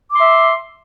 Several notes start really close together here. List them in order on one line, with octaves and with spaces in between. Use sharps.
D6 C6 E5